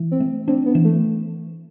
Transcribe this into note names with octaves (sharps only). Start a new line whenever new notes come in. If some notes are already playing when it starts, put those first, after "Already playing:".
Already playing: E3
C4
A3
C4 D4
B3
E3
A3